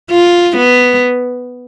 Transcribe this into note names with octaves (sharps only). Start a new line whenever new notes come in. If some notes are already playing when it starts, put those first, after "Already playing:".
F4
B3